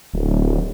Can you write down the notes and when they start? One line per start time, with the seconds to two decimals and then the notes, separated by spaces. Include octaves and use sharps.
0.14 D1